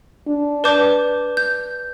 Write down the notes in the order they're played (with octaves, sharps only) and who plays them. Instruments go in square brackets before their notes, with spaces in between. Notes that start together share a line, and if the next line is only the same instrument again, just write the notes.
[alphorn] D4
[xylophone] B4 D5 A5 D6 G6
G6